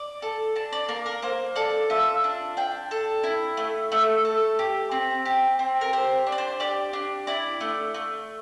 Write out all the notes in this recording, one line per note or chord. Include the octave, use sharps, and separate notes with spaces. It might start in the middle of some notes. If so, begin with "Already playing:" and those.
Already playing: D5
A4
D4 A5
D5
A#3 A#4
A#4
A#3 C5
A4 D5
F4 E5
D4
D4 G5
A4
E4
A3
A3 E5
A4
G4
C4
G4
C4
A#4
G4 C5
D4
D5
C5
G4 D5
D4
E4 D5
A3
A3